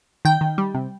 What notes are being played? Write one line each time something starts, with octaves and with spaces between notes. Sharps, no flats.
D#3 G5
D#3
G3
C3